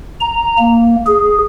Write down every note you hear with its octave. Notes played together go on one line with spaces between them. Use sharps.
A#5
A#3
G#4